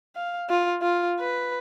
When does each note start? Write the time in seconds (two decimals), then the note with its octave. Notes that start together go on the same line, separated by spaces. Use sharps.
0.16 F5
0.49 F4
0.82 F4
1.20 B4